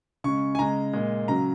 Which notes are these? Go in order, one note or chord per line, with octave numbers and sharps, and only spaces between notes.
C#3 G#3 C#6
G#5
C#3 G#3 A#5
A#2 G#3
C#3 F#3 A#5